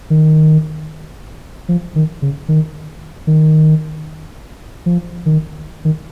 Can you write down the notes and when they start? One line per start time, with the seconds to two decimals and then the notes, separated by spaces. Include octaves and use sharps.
0.10 D#3
1.69 F3
1.96 D#3
2.22 C#3
2.49 D#3
3.27 D#3
4.86 F3
5.26 D#3
5.85 D#3